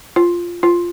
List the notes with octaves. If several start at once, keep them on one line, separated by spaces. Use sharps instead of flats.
F4
F4